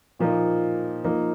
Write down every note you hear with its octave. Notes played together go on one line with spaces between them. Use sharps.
A#2 F3 A#3 D#4
F3 A#3 D#4